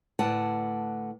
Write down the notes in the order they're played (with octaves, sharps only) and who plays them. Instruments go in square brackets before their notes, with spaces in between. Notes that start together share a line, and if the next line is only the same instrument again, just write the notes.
[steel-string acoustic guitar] D2 A2 B4 D5 F#5 A5